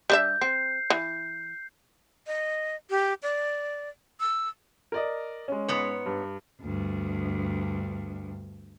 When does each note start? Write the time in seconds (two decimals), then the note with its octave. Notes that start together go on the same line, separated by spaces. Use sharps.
0.10 G3 D4 E5 G6
0.41 C4 C7
0.90 E3
2.27 D#5
2.90 G4
3.23 D5
4.20 E6
4.92 A#4 D5 D#5
5.48 G#3 C#4
5.68 G#2 B3 C#5
6.06 G2
6.61 D2 G2